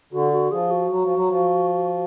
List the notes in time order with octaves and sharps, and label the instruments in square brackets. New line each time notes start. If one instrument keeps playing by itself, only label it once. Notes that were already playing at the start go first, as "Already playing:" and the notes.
[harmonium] D3 [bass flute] F#4
[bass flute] F#4
[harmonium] F3 [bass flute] G#4
[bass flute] F#4
[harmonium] F#3
F3
F#3
F3